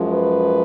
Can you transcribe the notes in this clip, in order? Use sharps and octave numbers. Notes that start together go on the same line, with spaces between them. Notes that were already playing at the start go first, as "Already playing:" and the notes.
Already playing: F#2 F3 G#3
B4